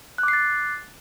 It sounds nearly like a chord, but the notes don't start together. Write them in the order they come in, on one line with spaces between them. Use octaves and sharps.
F#6 D6 C7 A6